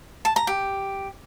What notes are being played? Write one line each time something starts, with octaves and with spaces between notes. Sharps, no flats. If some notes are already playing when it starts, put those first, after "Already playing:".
A5
A#5
G4